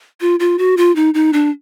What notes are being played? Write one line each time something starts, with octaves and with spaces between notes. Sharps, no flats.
F4
F4
F#4
F4
D#4
D#4
D4